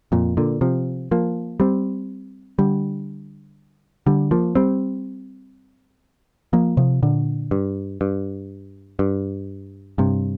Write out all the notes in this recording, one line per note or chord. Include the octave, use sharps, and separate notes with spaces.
F2 A#2
A#2 D3
C3 F3
F3 A#3
G3 C4
D3 G3
D3 G3
F3 A#3
G3 C4
F3 A#3
C3 F3
A#2 D3
G2
G2
G2
G2 C3